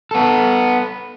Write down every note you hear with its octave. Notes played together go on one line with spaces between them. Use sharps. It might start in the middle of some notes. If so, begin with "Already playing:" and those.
B3 A4